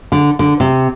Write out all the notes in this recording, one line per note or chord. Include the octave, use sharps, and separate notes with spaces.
D3
D3
C3